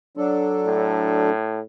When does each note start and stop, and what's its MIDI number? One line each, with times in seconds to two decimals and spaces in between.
0.17 1.30 54
0.17 1.30 62
0.17 1.30 69
0.66 1.61 45